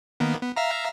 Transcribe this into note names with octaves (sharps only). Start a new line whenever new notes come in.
D#3 A#3 B3
B3
E5 F5 A#5